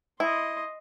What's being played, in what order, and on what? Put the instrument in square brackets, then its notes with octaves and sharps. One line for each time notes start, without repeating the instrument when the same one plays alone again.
[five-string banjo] E4 [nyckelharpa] D#5 C6